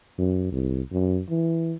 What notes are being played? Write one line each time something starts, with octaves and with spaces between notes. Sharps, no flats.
F#2
C2
F#2
E3